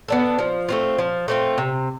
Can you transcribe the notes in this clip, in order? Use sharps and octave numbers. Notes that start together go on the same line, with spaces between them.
B3 D4 A4
F3
A3 C4 F4
F3
A3 C4 F4
C3